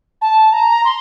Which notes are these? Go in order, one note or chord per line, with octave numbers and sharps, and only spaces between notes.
A5
A#5
C6